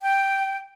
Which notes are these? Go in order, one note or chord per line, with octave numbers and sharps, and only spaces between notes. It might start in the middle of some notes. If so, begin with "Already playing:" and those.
G5